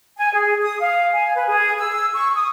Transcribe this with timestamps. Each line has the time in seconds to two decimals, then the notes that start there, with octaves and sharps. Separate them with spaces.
0.18 G#5
0.33 G#4
0.63 D#6
0.80 F5
1.14 G#5
1.36 B4
1.48 G#4
1.78 E6
2.14 C#6
2.34 D#6